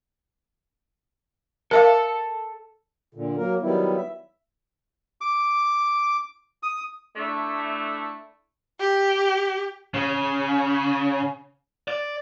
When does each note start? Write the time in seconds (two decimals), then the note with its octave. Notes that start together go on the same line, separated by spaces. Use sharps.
1.71 A4 A#4 E5 F5 A5
3.15 A#2 D3
3.37 F#3 A#3 A#4
3.62 D#3 F#3 G3 B3 E4
3.96 E5
5.21 D6
6.63 D#6
7.16 A3 D4 E4
8.80 G4
9.94 C#3
11.88 D5